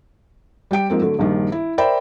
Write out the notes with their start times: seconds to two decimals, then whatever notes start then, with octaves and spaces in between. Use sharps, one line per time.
0.71 G3 G4 G5 D7
0.90 G#2 F3 A#3 C4
1.02 D3 F#3 A3
1.19 A#1 G2 D#3
1.52 E4
1.78 A#4 C5 D5 E5 G5 B5